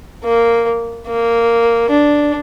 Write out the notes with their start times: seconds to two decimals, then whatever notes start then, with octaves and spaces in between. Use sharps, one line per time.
0.24 A#3
1.07 A#3
1.90 D4